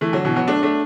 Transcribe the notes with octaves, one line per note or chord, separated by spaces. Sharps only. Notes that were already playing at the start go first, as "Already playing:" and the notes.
E3 A3
D3 F#3
B2 E3
F#3 B3
A3 D4
A3 D4